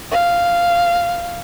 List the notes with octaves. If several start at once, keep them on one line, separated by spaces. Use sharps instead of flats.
F5